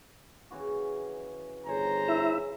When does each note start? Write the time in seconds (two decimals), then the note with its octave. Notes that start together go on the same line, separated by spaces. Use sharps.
0.50 C#3 E3 F#4
1.66 G1 G#4 C5 C#5 G#5 A#5
2.08 E4 E5